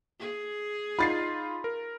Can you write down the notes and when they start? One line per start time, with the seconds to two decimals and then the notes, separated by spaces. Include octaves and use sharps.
0.19 G#4
0.99 D#4 F4 B5 A6 C7
1.64 A#4